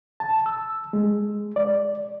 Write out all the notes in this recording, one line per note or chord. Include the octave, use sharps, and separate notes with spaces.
A5
E6
G#3
D5